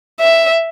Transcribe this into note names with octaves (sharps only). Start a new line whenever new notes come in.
E5